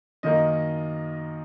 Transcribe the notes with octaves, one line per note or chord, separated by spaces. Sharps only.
F#2 D#3 A#3 D#4 D#5